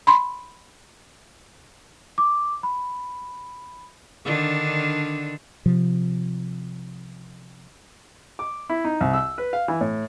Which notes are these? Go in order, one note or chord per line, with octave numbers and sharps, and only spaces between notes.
B5 C6
D6
B5
D3 D#3 D4
C3 F3
D6
E4
D#4
C2
E6
B4
F5
E3
A2